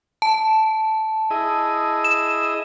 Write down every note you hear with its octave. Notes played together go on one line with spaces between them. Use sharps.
A5
E4 G#4 D#5
E7